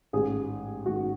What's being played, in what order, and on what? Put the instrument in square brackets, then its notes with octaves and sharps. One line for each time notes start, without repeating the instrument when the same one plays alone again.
[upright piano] A1 G#2 D#3 G#4
A1 G#2 D#3 F#4